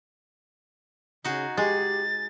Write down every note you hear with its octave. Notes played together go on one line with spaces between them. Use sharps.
C#3 D#4 F#4 G#4
G#3 G4 G#4 A6